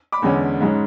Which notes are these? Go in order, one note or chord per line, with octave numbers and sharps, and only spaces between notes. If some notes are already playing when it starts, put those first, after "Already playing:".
B5 D6
E2 D3 G#3 C#4
G#2 G#3 C#4